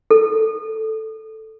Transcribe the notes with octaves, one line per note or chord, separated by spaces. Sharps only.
A4